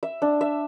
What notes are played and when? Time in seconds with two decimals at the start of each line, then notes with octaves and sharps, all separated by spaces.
0.03 E5
0.22 D4
0.41 E5